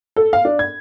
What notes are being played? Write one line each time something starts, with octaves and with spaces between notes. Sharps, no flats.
A4
F5
D4
G#6